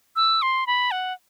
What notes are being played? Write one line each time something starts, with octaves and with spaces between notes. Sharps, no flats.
E6
C6
B5
F#5